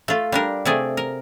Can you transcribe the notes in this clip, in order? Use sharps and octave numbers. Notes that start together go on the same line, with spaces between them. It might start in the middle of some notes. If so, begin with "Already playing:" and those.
A3 F4
G3 D4 A#4
C3 A3 G#4 D5
A#4